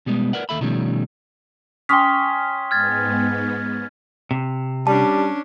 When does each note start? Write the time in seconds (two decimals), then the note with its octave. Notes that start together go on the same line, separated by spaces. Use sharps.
0.06 B2 G3 G#3 B3
0.33 A#4 B4 D5 F#5
0.49 D#2 A4 E5 B5
0.61 B2 D#3 F3 G3 A3 C#4
1.89 C#4 G5 C6 D#6 B6 G7
2.71 G#2 G#3 B3 F6 G#6 A6
4.31 C3
4.87 G3 C#4 D4 A5